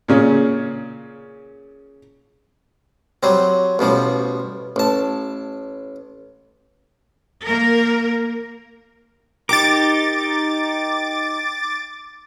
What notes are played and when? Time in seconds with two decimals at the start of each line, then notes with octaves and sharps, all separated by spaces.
0.08 A#2 C#3 C#4
3.23 F#3 G3 C4
3.79 A1 B2 F3 G3
4.76 A1 A5
7.43 A#3 A#4
9.49 D#4 G4 A#4 D6 A6